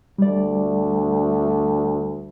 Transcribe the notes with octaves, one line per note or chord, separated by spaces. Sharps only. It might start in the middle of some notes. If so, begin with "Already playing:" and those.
D2 G3 D5